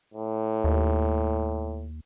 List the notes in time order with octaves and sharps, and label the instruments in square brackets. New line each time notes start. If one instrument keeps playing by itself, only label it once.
[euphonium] A2
[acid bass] D#2